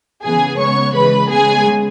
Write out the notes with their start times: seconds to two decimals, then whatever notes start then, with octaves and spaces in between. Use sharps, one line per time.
0.22 C#3 E3 B3 G#4 G#5
0.58 C#3 G#3 B3 C#5 C#6
0.93 C#3 E3 G#3 B4 B5
1.30 C#3 G#3 B3 G#4 G#5